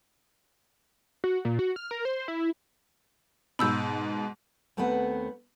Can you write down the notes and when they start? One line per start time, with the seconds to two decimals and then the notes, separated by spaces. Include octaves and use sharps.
1.24 F#4
1.45 A#2
1.59 F#4
1.76 F6
1.91 A#4
2.05 C5
2.28 E4
3.59 G#2 B2 B5 E6 G6
4.77 D#2 A3 B3 C4 B4 F#5